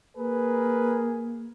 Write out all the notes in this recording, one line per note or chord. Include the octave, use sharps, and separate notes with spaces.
A#3 G#4 A#4 B4